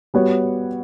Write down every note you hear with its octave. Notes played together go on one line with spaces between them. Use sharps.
G3 B3 F#4 C#5